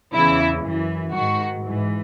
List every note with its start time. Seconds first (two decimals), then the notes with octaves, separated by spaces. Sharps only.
0.13 E2 C#3 E3 E4
0.63 F#2 E3
1.14 G#2 D#3 F#4
1.64 G#2 E3